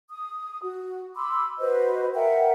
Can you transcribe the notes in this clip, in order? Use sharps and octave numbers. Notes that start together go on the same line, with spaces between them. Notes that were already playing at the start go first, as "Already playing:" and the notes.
D#6
F#4
B5 C6 D6 E6
F#4 B4 C5 D#5
A#4 E5 F#5 G5